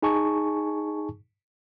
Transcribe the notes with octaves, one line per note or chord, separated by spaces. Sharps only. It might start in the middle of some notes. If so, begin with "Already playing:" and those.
D#4 G#4 G#5 A5 C#6